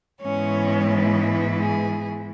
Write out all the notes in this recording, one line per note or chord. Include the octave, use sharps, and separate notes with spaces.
G#2 E3 G#3 B3 C#4 E4 C#5
G#4